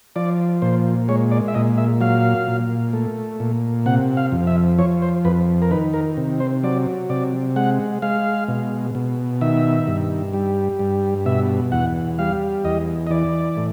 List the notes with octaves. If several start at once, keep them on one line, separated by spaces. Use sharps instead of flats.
F3 D5
A#2 C5
G#3 C#5
D5
E5
A#2 D#5
E5
F#3 F5
A#2
A3
A#2
C3 F#5
F5
F2
E5
F3 C#5
C5
F2 B4
A#4
D#3 B4
A#4
C3
C5
F#3 D5
C3 D5
G#3 F#5
G#3 F5
B2
B2
D#3 E5
G2
G3
G2
B2 E5
E2 F#5
G3 F5
E2 D#5
D#5
E3 D5
A2